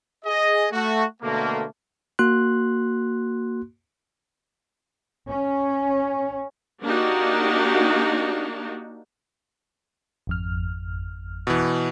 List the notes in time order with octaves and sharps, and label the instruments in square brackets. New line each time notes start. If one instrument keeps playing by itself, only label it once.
[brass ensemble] G#4 D#5
A3 F#4
B2 D3 A3 A#3
[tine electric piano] A#3 F#4 C6 F#6
[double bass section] C#4
[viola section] A#3 D4 D#4 F#4 G4
[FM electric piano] G#1 F2 F6
[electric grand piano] B2 E3